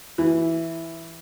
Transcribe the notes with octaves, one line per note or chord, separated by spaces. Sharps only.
E3